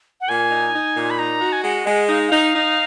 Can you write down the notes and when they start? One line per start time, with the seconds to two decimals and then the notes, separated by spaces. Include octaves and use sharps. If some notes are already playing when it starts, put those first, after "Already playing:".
0.21 F#5
0.29 A#2 G#5
0.51 D#4
0.74 D#4
0.96 A#2
1.10 B5
1.19 D#4 A#5
1.41 F#4
1.52 G#5
1.64 G#3 F#5
1.86 G#3
2.09 D#4 F5
2.28 D#4 F5
2.55 D#4